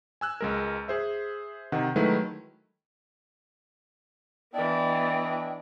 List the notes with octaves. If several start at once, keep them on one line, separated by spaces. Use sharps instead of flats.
G#5 E6 F#6
C#2 G#3 A#4
G#4 C5 E5
C3 D#3 F#5
D#3 F#3 G#3 A3 E4 B4
E3 B3 D4 E4 D5 D#5 G5